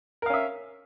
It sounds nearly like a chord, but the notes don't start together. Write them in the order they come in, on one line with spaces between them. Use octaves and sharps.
A#4 F5 C#4 E5